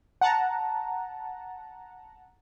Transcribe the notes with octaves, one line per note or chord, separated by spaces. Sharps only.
F#5 A5 A#5